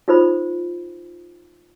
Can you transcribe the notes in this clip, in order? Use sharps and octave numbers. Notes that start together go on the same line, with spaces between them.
D#4 F4 A4 C5 B5